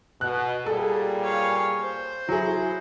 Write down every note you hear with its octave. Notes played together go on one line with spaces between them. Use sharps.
B2 F#6
A#2 G3 G#4 A4
C#5 F5
C5
F#3 E4 G#4